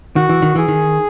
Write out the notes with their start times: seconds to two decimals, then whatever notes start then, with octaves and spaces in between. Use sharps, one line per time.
0.16 D#3 F#4
0.29 E3
0.42 D#3
0.55 E3 G#4
0.68 D#3